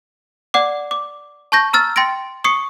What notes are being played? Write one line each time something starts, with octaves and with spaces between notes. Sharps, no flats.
D5 F#5 D6
D6
A5 C#6 G6 A#6
A#5 E6 F6 A6
G5 C6 A6 A#6 D7
C#6 D#6 C7 C#7